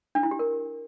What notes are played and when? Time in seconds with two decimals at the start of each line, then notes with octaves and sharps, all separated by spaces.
0.15 D4
0.23 E4
0.31 G4
0.39 A#4